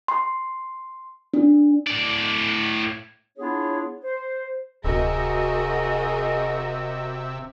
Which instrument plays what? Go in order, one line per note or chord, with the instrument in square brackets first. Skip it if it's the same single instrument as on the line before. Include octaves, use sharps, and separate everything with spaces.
[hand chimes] C6
D4
[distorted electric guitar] A2 D5
[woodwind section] B3 D4 E4 F4 G#4 C#5
C5
[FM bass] D1 [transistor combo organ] C3 E5 [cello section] F#4 A#4 D#5 [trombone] G#4